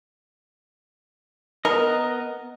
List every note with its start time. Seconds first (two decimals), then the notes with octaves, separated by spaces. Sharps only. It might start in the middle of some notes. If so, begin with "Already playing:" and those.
1.65 B3 A#4 D#5